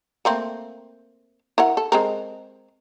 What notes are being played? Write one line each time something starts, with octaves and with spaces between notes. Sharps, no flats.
A3 A#3 C4
E4 A#4 F#5
A4
G#3 C4 A#4